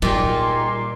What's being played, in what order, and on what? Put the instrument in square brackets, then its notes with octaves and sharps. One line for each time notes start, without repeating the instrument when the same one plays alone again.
[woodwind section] E2 G#5 C6 [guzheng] A#2 [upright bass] G3 [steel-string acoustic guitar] D#4 G4